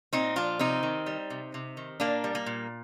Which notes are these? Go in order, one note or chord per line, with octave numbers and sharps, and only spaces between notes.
A#2 C4 D#4
F3 D4 F4
C3 C4 D#4
D#3
G3
C3
C3
D#3
A#2 A#3 D4
G3
A#3
A#2